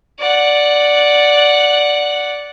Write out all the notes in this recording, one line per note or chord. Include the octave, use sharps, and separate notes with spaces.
D5 F#5